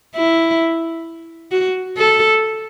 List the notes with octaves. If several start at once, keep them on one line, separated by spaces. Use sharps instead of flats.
E4
F#4
A4